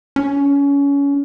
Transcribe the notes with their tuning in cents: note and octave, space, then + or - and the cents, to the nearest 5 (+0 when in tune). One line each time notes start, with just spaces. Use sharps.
C#4 +25